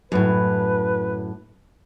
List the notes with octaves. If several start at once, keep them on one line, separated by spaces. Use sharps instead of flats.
F#2 A2 B4